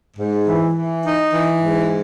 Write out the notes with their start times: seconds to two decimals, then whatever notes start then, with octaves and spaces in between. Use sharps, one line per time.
0.17 G#2
0.46 E3
0.75 E3
1.04 D#4
1.33 E3
1.61 G#2